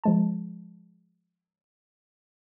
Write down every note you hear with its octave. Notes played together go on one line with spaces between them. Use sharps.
F3 G#3 A5